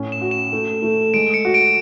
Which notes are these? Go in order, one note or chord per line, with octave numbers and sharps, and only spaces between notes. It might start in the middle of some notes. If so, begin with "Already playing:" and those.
Already playing: A2 C#4
E7
F#4
E7
A3
A3
G#3 D7
C#7
F#4
D7